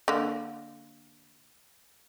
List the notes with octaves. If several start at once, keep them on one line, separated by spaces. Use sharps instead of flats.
D3 A#3